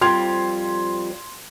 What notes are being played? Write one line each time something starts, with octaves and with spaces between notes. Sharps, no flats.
F2 F3 G3 C6 G#6 F7